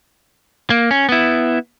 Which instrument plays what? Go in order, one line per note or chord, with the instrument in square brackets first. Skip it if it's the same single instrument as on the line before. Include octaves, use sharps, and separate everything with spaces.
[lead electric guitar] A#3
C#4
B3 E4